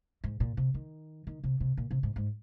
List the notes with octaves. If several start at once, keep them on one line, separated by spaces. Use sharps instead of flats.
G#2
A#2
C3
D#3
D#3
C3
C3
A#2
C3
G#2
G#2